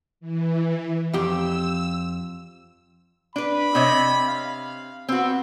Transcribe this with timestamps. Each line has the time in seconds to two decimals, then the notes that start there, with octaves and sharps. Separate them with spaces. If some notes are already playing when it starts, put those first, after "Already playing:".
0.20 E3
1.13 F2 G4 E6
3.36 D4 B4 B5
3.75 C3 C#5 D#5
4.28 F5
5.09 B3 C4 F#4